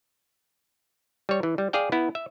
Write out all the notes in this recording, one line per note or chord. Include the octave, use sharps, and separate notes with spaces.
G3 C#5
E3
G3
G#4 D5 F5 G5
B3 E4
E5